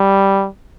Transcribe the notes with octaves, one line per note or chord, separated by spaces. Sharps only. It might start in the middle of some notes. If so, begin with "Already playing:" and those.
Already playing: G3